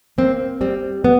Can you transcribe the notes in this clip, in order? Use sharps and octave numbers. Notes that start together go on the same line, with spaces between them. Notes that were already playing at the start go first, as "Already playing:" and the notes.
A#3 C4
G3 C4
B3